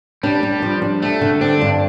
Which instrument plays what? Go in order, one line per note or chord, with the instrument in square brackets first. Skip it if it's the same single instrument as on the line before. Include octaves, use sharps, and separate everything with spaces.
[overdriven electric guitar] G3 [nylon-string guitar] D4
[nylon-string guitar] D4
F3
D4
[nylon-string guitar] G3 [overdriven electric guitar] A3
[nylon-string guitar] D3
[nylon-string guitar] C4 [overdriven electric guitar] D4
[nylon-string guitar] G2